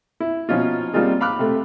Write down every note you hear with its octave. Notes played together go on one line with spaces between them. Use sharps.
E4
B2 F3 C#4 D#4 F4
G3 A#3 C4 D#4 F4 G#4
F5 B5 D6 F6 F#6
C3 A3